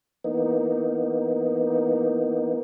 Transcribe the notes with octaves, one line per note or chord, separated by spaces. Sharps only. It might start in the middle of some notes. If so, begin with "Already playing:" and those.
E3 A#3 B3 D#4